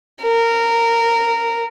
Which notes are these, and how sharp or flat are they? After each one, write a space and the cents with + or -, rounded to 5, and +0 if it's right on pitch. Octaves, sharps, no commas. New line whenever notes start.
A#4 -15